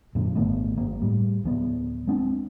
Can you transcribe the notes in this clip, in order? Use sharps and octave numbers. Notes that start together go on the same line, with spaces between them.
F#2 A#2 D3
G#1 D#3 A3 B3
G1 A#3
A2 G3
D1 F3 B3
G#3 C4 D4